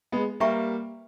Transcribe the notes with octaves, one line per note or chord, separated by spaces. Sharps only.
G#3 B3
G3 A#3 B4 E5 G5 A#5 C#6